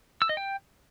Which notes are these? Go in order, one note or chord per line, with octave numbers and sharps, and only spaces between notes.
E6
D#5
G5